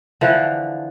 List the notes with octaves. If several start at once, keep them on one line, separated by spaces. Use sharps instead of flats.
D3 E3 F3